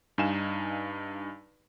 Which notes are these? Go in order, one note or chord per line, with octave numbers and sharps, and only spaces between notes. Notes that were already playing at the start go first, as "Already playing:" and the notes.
G2 D#4 F5 G#5 E7